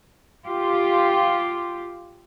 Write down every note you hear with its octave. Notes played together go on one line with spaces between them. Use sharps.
F4 G4